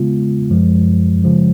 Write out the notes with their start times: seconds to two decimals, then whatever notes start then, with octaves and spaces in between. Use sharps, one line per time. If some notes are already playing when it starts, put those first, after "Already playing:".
Already playing: C#3 G#3 B3 F4
0.51 F#2 F3 G#3
1.23 C#3 F3 G#3